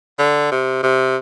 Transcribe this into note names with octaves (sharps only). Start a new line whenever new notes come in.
D3
C3
C3